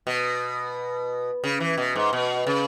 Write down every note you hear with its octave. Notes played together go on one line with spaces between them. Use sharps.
B2
C#3
E3
B2
G#2
B2
C#3